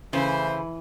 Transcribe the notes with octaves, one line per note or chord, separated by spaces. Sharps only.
C#3 E3 A3 E4 C5